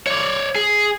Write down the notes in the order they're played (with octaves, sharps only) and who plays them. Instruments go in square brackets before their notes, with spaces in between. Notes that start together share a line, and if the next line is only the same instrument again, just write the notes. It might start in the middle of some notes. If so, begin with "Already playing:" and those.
[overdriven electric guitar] C#5 D5
G#4